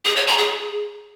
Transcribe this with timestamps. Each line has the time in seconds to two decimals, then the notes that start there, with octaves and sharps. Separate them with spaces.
0.05 G#4
0.16 C#5
0.27 A#5
0.38 G#4